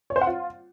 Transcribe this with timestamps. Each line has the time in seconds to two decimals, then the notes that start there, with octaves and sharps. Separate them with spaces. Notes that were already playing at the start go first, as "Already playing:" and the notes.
0.10 C#5
0.16 C5
0.21 F#5
0.27 F4